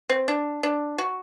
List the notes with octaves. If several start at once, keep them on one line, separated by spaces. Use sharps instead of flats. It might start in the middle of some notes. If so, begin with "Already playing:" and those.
C4
D4
D4
F#4